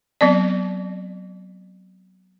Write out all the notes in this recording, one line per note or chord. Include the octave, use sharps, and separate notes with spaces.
F#3 B3 C4 D5